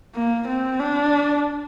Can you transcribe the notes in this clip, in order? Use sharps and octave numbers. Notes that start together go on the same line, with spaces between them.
A#3
C4
D4